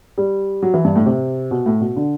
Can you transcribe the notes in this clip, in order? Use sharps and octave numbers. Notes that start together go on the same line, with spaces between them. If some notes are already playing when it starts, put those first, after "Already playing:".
G3
F#3
E3
G2
A2
C3
B2
A2
B2
D3